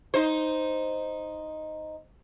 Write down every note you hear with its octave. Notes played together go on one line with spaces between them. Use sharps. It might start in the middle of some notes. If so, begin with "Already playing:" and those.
D#4 C5